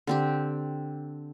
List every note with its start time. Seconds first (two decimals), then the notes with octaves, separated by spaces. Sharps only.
0.07 D3 C4 G4